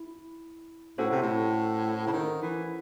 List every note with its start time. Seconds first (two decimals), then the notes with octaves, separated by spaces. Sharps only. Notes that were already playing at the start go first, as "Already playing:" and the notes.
Already playing: E4
0.98 A2 C#4 F#4 A4 C5 F#5
1.11 C3
1.22 A2
2.07 C#3
2.13 D#3
2.42 E3